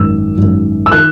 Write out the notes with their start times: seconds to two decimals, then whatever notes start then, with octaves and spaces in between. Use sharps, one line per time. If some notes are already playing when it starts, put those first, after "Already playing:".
Already playing: G#1 F#2 D#3 E6
0.38 G#1 F#2 D#3
0.86 E6
0.92 D#3 F#6